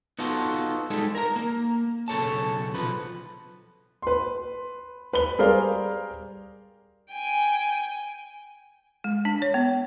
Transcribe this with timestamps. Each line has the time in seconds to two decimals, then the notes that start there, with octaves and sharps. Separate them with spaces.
0.19 B3 D#4 F4 F#4 A4
0.90 G3 G#3 D#4 A4
1.15 A#4 A#5
1.36 A#3
2.08 B1 C#3 A4 C#5 A5
2.75 B1 F3 B4
4.02 B4 C6
5.13 B4 B5 G7
5.38 G3 G#4 A#4 C5 D5 F5
7.11 G5 G#5
9.04 G#3
9.25 D4
9.42 C#5
9.54 B3